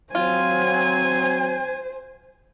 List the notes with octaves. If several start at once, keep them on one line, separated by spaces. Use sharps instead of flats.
F#3 C4 F4 C5 G#5